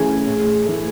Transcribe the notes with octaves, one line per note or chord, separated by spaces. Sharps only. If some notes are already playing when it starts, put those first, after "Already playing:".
Already playing: C#3 E3 A3 C#4 G#4
A2
E3 A3